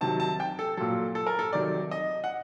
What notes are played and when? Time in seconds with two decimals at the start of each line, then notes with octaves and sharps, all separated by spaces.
0.01 C3 D#3 F#3 A5
0.20 A5
0.40 G5
0.59 A4
0.77 A#2 F#3 A4
1.15 A4
1.27 A#4
1.39 A4
1.53 C3 D#3 F#3 D5
1.91 D#5
2.24 F#5